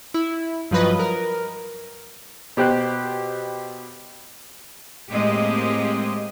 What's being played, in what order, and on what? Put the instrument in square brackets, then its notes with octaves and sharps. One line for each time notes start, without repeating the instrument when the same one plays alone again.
[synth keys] E4
G2 F3 F#3 B4 D#5
A#4
[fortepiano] B2 G4 C5 G5 F#6
[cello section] A2 G#3 A#3 C4 G4 D#5